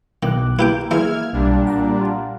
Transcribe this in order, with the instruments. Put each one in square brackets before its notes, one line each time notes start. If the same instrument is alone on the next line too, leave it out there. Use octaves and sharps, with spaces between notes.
[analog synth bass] B1 [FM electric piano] B2 D6 F#6 [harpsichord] D#3
[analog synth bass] A#3 [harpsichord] E4 G4 G5 [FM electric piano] B4
[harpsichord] E3 G#3 [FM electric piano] E5 E6 [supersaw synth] F6 G#6
[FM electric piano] B1 [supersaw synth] A#2 G3 D4
[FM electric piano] F#5 A#5
[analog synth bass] F4